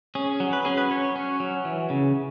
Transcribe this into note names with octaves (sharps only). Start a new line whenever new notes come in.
C#4 G#4
F#3
B4
C#4 G#4
B4
F#3 C#5
C#4
F#3
E3
C#3